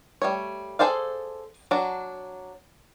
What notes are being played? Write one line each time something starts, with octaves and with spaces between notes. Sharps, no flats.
G3 A3 C#5
G#4 A4 C5 D5 F5
F#3 D4